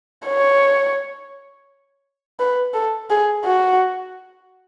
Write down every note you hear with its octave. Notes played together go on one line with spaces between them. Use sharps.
C#5
B4
A4
G#4
F#4